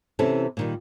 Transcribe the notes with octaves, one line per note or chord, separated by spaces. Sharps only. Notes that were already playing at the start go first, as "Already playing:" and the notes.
C3 E3 C#4 E4 A4
A#2 D#3 G3